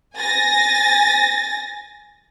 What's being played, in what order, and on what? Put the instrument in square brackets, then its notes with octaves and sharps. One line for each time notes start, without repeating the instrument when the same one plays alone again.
[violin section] G#5 A6 A#6